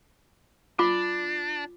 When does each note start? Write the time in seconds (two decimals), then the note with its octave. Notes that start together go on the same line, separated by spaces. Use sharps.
0.79 D4 F4 D6